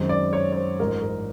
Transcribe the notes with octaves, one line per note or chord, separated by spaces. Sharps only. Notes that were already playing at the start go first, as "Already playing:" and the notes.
Already playing: F#2 D#3 G#3 C4
D5
C#5
C#5
C5
A1 G#2 F3 A#4
A#4